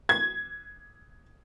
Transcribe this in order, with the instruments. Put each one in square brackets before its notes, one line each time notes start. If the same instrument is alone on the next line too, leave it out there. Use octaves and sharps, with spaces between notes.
[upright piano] G#6